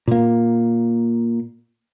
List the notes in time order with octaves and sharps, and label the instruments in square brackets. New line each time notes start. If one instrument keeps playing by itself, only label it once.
[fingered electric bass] A#2 A#3